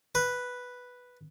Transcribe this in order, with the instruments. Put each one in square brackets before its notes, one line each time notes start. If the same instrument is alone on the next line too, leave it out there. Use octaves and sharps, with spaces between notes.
[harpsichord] B4